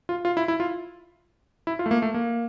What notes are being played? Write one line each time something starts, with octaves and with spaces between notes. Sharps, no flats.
F4
F4
E4
E4
F4
E4
F4
A3
A#3
A3
A#3